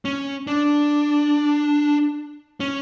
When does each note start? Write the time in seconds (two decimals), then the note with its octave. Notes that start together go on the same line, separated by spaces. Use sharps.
0.05 C#4
0.47 D4
2.60 C#4